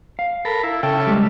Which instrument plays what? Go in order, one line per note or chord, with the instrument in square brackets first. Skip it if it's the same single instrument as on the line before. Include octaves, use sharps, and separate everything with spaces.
[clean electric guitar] F5
[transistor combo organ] A4 A#4 B5
E4
[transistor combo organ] C#3 A4 E5 [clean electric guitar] G5
[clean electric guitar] G3 G#3